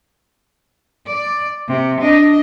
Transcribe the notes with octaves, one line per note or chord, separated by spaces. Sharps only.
D5
C3
D4 D#5